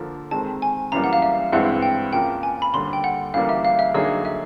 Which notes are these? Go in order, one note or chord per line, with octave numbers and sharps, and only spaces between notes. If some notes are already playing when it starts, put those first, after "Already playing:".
Already playing: D3 F3 A#3
D#3 G#3 C4 A5
G#5
F#2 C#3 E3 G3 A#3 A#5
F#5
F5
E5
G2 E3 G#3 C4 E4 F#5
G5
C#3 F3 A#3 G5
G#5
B5
D#2 D3 G3 C6
G5
F#5
D2 C#3 E3 G3 A#3 F5
E5
F5
E5
D3 F#3 A#3 D#4 G#4 D#5
E5